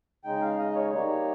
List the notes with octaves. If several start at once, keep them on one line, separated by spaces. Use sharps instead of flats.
C#3 G#3 D#4 G5
F5
D#5
C#5
G3 A#3 D#4 C#5